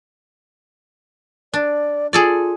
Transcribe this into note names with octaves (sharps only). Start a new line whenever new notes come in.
D4 D5
F4 G#4 A4 D5